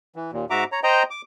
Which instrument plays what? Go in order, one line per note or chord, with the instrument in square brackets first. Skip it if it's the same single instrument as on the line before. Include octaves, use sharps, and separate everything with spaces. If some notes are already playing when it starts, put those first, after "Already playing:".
[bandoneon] E3
D#2 A#2
G#2 F#4 E5 A#5 D6
C#5 A#5
C5 D#5 G5 A#5
D6